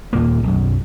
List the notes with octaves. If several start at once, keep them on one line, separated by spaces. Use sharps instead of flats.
D#2 A#2 A#3
B1 F#2